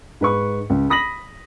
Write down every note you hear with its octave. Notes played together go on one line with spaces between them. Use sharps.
G#2 B4 C#6
C#2
B5 D#6 A#6 B6 F#7